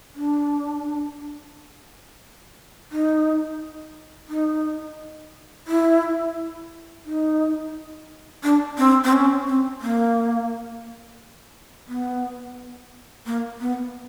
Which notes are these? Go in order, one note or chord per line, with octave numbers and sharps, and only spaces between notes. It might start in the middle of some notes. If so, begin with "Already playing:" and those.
D4
D#4
D#4
E4
D#4
D4
C4
C4
C#4
C4
A#3
B3
A#3
B3